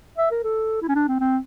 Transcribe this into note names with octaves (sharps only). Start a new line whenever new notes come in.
E5
A#4
A4
E4
C#4
D4
C4
C4